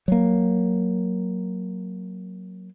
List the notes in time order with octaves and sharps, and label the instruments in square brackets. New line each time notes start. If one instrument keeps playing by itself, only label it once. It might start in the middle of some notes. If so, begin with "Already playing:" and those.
[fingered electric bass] F#3 A#3